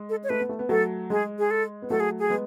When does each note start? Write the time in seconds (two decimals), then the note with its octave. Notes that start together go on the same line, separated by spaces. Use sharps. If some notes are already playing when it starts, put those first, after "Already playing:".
Already playing: G#3
0.09 A4
0.24 C#5
0.29 A3 B4
0.40 B3
0.49 A3
0.59 B3
0.69 F#3 A3 A4
1.10 G#3 G#4
1.39 G#4
1.51 A4
1.82 B3
1.90 F#3 A3 A4
2.00 G#4
2.19 G#4
2.30 G#3 B3